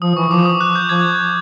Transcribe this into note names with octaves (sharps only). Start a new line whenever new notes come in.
F3 D#6
E3 C#6
F3 D6
D#6
F#6
G6
F3 G#6